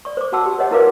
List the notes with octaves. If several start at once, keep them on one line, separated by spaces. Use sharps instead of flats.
D5 C#6
C5 D6
F#4 F#5 A5 E6
G4
C5 C#5 D#5 F#5
E4 F#4 A#4 B4 F5 D6